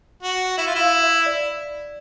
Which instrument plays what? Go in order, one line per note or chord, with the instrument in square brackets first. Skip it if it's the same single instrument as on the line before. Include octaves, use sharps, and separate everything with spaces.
[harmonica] F#4
[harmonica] E4 [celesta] E5
[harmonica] F4
E4
[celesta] F5
E5
D5